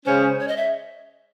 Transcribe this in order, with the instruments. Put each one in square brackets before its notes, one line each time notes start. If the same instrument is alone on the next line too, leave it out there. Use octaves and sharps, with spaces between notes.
[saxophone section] C#3 G#3 C#4 [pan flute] C5
[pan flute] C#5
D#5
E5